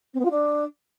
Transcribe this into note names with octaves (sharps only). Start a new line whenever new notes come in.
C4
B3
F4
D4